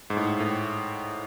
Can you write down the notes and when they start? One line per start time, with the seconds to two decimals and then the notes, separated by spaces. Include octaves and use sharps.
0.10 G#2
0.17 A2
0.40 A2